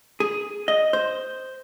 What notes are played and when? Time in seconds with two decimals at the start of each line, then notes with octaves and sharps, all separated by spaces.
0.20 G#4
0.68 D#5
0.93 C5